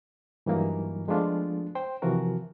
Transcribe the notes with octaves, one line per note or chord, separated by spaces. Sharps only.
G2 E3 F#3 A#3 D#4
F3 G#3 A3 B3 D4 F4
C5 G5
C3 E3 F3 F#4 A#4